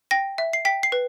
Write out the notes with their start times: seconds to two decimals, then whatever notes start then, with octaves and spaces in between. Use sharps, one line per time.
0.11 G5 A#6
0.38 E5
0.53 C7
0.65 G5 B6
0.83 C7
0.92 B4